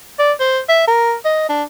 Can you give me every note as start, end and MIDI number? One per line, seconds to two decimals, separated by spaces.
0.19 0.32 74
0.40 0.59 72
0.69 0.85 76
0.88 1.14 70
1.25 1.45 75
1.49 1.63 62